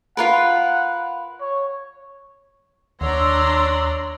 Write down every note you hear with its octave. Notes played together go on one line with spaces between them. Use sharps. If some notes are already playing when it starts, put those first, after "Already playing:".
F4 A#4 B4 F#5
C#5
D#2 D4 C#5 D5 A#5 C6 E6